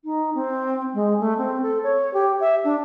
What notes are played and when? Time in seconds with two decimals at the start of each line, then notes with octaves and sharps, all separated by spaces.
0.05 D#4
0.35 C4
0.94 G#3
1.20 A3
1.38 C4
1.62 A4
1.83 C#5
2.14 G4
2.40 E5
2.64 D4